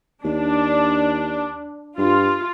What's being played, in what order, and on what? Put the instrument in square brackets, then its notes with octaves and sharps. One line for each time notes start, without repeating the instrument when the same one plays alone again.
[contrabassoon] D#2 [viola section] D4
[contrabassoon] G2 [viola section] F4